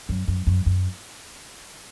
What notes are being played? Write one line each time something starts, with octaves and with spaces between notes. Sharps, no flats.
F#2
F#2
F#2
F#2